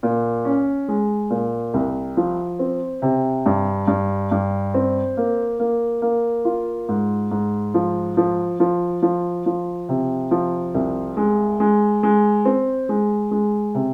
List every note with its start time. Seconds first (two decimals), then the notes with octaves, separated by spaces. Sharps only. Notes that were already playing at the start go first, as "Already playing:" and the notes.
0.03 A#2
0.45 C#4
0.88 G#3
1.30 A#2
1.74 C2
2.17 F3
2.59 C4
3.02 C3
3.46 G2
3.88 G2
4.31 G2
4.74 C4
5.17 A#3
5.60 A#3
6.02 A#3
6.45 F4
6.89 G#2
7.31 G#2
7.74 F3
8.17 F3
8.60 F3
9.02 F3
9.46 F3
9.89 C3
10.31 F3
10.74 C2
11.17 G#3
11.60 G#3
12.03 G#3
12.45 C4
12.89 G#3
13.31 G#3
13.75 C3